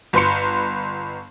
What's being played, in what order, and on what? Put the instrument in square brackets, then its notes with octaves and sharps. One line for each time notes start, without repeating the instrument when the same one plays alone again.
[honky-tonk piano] G1 B4 C6 C#7